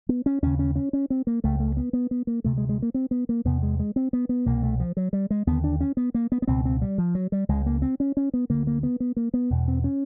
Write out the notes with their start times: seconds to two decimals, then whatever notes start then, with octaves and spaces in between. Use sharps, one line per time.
0.09 B3
0.26 C#4
0.42 D#2 C#3 C#4
0.59 C#4
0.76 C#4
0.93 C#4
1.10 C4
1.27 A#3
1.44 C#2 C#3 A3
1.60 A3
1.77 B3
1.93 B3
2.11 B3
2.27 A#3
2.44 D2 C3 A3
2.58 G#3
2.69 G#3
2.82 A#3
2.94 C4
3.11 B3
3.29 A#3
3.45 E2 C3 B3
3.63 G#3
3.79 G#3
3.96 C4
4.13 B3
4.29 B3
4.46 C2 B2 A#3
4.63 A3
4.80 F3
4.97 F#3
5.13 G3
5.30 G#3
5.47 D#2 D3 B3
5.64 D4
5.80 C#4
5.97 B3
6.14 A#3
6.32 B3
6.42 B3
6.47 C#2 B2 C4
6.65 C4
6.82 G3
6.98 F3
7.15 F#3
7.32 G3
7.49 C#2 C#3 G#3
7.66 A#3
7.82 C4
8.00 C#4
8.17 C#4
8.34 B3
8.50 D2 D3 A#3
8.67 A#3
8.83 B3
9.00 B3
9.17 A#3
9.34 B3
9.50 E2 B2
9.68 C4
9.84 C#4